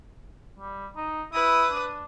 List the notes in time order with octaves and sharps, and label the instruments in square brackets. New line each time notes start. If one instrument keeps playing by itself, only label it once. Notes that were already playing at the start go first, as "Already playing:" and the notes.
[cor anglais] G3
D#4
[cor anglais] E4 [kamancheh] B4 D#6
[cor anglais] D4